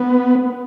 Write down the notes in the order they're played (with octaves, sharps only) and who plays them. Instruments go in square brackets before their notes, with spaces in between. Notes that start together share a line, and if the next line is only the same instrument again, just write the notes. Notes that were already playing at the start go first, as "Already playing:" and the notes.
Already playing: [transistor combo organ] B3